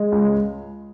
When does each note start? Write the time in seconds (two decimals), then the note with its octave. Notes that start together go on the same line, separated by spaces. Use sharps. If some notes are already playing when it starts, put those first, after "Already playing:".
Already playing: G#3
0.12 C#2